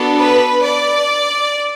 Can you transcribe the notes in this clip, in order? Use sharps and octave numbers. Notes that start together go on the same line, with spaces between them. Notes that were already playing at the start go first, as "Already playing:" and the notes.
Already playing: B3 D4 F#4 A4
B4
D5